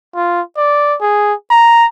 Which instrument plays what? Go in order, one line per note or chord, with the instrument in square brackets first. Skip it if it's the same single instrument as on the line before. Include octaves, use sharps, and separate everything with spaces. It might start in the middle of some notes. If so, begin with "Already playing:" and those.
[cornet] F4
D5
G#4
A#5